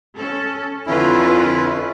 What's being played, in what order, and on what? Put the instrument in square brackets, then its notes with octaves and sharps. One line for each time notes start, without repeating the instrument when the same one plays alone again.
[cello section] C#4 A4
[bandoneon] F2 C#4 E4 [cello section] D3 F4 B4